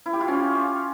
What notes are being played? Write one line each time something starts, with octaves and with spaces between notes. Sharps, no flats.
E4
G4
F4
C#4